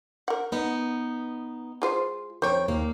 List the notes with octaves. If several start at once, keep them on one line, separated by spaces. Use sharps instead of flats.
A#4 F#5
B3 D#4
G#3 F4 C5
F2 C5 C#5 G5
D#2 A#2 A#3